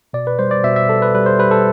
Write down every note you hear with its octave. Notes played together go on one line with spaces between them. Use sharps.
B2 D5
B4
G3 C5
D5
B2 E5
E5
G3 A4
B4
G3 B4
C5
G3 B4
A4